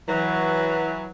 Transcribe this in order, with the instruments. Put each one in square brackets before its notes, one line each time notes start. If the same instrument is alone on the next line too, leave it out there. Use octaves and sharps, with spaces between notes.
[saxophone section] E3 F#3